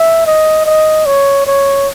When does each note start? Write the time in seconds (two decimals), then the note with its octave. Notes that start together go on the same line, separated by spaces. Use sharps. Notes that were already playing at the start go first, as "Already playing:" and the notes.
Already playing: E5
0.26 D#5
0.65 D#5
1.06 C#5
1.46 C#5